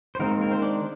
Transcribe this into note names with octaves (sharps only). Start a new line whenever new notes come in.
C5
D#3 G#3 A#3 C4 A#4
A#3 A#4
C4 C5
D4 D5